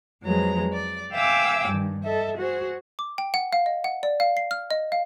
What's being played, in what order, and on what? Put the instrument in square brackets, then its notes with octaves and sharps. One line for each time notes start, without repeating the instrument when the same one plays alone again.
[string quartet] F2 F3 F#3 G#3 B4 A#5
D5
E5 F5 G5 G#5 D6 E6
G2 D#3
A4 D#5 E5
F#4 G#4 C5
[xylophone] D6
G5
F#5
F5
D#5
F#5
D5
F5
C7
F6
D#5
F5